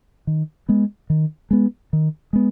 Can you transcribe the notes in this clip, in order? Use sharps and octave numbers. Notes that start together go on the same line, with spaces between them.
D#3
G#3 B3
D#3
G#3 B3
D#3
G#3 B3